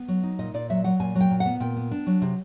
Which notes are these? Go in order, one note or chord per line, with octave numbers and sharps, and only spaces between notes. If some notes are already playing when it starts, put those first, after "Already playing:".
Already playing: B3
F#3
D#4
A#2 D#5
A#2 D5
F#3 E5
F#3 F#5
A#2 G#5
F#3
G5
A#2
F#5
B3
A#2 G5
B3
D4
F#3
C3